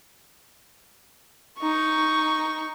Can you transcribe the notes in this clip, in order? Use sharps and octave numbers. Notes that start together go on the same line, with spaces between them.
D#4 C#6